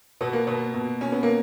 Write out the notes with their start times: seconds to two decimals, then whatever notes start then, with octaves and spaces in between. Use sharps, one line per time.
0.21 B2 B3
0.33 A#3
0.47 B2 B3
0.74 B2
1.01 B2 C#4
1.12 B3
1.23 A#3